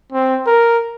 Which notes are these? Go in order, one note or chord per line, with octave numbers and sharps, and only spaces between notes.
C4
A#4